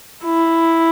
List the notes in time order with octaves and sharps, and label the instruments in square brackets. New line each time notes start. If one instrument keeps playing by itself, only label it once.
[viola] E4